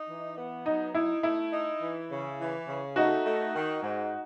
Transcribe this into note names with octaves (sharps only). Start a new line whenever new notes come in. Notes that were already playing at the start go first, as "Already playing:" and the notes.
Already playing: D#4
E3
B3
F#3 D#4
D#4 E4
A3 E4
D#4
E3
C#3
E3
C#3
A3 D#4 F#4
A3
D#3
G#2